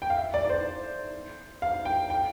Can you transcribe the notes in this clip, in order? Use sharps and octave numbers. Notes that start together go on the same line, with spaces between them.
G5
F5
E5
D5
D5
C5
F5
G5
G5